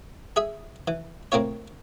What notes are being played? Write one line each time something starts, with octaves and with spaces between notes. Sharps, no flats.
G#4 E5 D#6
E3
A2 A#3 C4 F4 C#5